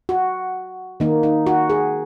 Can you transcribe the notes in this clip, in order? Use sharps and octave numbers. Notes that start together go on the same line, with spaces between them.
F#4
D#3 A#3 D#4
D#4
F#4
G#4